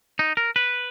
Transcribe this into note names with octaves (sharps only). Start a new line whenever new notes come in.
D#4
A#4
B4